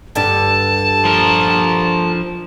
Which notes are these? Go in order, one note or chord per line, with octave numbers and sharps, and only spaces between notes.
G2 D3 D4 A5
F3 A#4